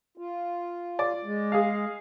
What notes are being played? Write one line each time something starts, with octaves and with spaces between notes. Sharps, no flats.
F4
D5
G#3
G#4 F5